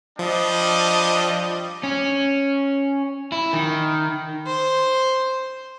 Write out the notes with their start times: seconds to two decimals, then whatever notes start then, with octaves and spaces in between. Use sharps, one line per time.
0.19 F3 G3 D4 D#5
1.83 C#4
3.32 E4
3.53 D#3
4.47 C5